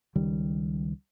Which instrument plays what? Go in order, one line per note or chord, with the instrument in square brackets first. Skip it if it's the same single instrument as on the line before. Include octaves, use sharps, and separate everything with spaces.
[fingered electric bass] C#2 D#3 G3